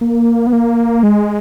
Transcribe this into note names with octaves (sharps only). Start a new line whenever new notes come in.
A#3
B3
A#3
G#3